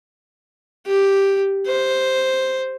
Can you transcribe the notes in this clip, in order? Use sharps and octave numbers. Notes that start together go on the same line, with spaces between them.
G4
C5